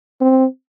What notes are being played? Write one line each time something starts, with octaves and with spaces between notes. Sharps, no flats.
C4